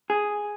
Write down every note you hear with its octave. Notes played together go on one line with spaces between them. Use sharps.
G#4